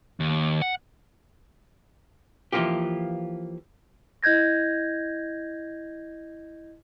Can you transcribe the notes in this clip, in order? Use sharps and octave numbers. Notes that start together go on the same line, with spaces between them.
D#2
F#5
E3 F3 A#3 F4 G4
E4 D#5 G6 G#6 A#6